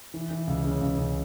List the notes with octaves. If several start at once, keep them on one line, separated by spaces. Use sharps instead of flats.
E3
E3
C#2
C#3
C#2
C#2